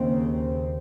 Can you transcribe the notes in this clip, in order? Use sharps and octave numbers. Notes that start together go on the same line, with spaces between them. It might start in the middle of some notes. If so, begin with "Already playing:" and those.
Already playing: D#2 C#3 C4